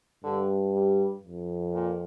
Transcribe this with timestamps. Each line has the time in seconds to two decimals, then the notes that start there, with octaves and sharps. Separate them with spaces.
0.24 G2 D3
0.74 G3
1.23 F2
1.73 A#2